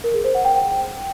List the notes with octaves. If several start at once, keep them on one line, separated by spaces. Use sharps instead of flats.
A#4
G#4
C5
F#5
G5